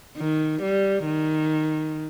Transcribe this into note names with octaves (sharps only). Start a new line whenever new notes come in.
D#3
G3
D#3